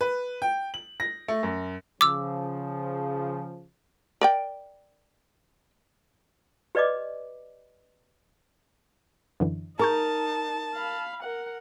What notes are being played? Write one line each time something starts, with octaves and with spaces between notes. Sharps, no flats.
B4
G5
F#7
A#6
A3
F#2
C#3 F3 D6 E6
A#4 D5 G5
G4 B4 D5 D#5 D6
F#2 D3 E3
D#4 G#4 A#4 A5 C#6 G6
F5 B5
A#4 F#5